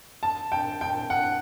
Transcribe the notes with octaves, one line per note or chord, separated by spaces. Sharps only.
A5
G5
G5
F#5